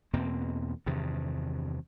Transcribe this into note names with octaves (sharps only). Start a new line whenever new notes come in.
E2 B2 A#3 C4
E2 G2 C3 D#3